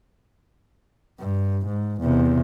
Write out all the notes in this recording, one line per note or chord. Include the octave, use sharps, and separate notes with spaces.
G2
G#2
E2 C3